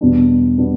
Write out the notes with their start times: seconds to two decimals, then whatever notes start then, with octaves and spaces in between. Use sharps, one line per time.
0.01 E2 B2 G3 B3 D4
0.58 B2 G3 B3 D4